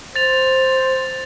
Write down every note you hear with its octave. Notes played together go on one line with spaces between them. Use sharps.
C5 A6 F7